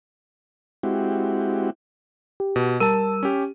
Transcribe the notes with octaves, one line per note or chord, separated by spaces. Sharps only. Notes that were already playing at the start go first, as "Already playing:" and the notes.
G#3 C4 E4 F#4 G4
G4
B2
G3 A#4 A5 E6 D#7
C#4 G4